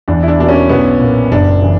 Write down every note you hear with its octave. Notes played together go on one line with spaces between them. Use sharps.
E2 D4
E4
D4
B2 A#3 D4
C#4
B1 B3
A#2 A#3
F#1 D4
C#3 E3